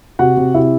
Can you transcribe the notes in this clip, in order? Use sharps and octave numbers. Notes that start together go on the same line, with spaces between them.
C3 F#4 F#5
C3
C3 E4 E5